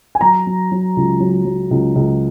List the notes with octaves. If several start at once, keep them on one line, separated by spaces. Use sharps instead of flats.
G#5
F#3 A#5
F#3
F#3
C#2
F#3
F#3
C#2
C#2